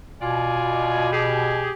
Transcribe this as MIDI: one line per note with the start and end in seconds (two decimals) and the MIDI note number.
0.21 1.72 47
0.21 1.07 65
0.21 1.07 74
0.21 1.07 80
1.12 1.71 67
1.12 1.71 68